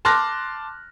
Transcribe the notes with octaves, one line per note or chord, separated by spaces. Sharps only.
A5 C6 D6 F6 F#6 A#6